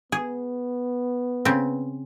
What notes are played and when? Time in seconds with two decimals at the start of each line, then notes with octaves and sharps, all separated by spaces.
0.12 B3 G#4
1.45 C#3 C4